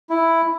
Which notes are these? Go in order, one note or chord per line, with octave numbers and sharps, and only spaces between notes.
E4